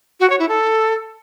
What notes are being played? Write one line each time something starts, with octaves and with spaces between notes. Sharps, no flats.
F#4
C#5
E4
A4